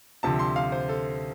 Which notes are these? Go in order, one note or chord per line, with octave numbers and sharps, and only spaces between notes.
D2 C3 F3 A5
C6
F5
C5
A4